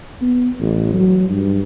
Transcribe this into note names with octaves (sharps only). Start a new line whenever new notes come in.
B3
A1
F#3
G2